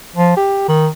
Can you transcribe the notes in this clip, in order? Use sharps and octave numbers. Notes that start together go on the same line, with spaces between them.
F3
G4
D#3